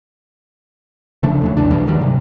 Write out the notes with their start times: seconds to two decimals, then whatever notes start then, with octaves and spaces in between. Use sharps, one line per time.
1.23 C#3 F3 A3 D4
1.41 D#2 C#3 F#3
1.57 B1 E2 E3 D4
1.71 D2 G2 B2 E3
1.87 G2 D#3 F#3 G3
2.01 C3